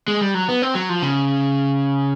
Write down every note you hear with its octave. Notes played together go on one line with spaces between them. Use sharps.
G#3
G3
F#3
B3
C4
F#3
F3
C#3